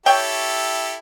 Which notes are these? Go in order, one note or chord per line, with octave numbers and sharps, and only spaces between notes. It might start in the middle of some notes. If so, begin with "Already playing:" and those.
E4 G4 A4 C#5 G5